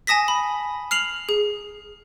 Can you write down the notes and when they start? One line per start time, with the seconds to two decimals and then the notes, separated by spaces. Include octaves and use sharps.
0.07 G#5 A5 D#6 A#6 B6
0.28 B5
0.91 F6 C7 F7 F#7
1.29 G#4